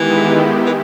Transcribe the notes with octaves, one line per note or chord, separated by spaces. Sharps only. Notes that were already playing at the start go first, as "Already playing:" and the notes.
Already playing: D#3 E3 G#3 B3 E4 G4
E3